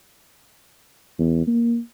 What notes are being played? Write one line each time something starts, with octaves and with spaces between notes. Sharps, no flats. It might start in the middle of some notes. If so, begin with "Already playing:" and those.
E2
A#3